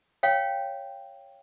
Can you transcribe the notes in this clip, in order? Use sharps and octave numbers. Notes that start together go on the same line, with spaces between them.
C#5 F5 G5